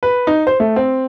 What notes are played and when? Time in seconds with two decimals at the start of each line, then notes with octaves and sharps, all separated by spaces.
0.03 B4
0.27 D#4
0.47 C5
0.60 A3
0.76 C4